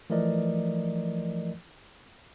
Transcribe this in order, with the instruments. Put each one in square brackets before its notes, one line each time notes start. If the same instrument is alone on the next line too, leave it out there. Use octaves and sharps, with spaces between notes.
[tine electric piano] E3 F3 A3 A#4 D5 D#5